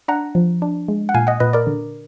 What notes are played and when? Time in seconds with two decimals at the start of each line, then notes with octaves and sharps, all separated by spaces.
0.08 D4 F#5 A#5
0.35 F3
0.62 D4
0.88 G#3
1.09 F#5
1.14 A#2 F5 G#5
1.27 D#5 F#5
1.40 A#2 B4 D#5
1.53 A#4 D5
1.67 D3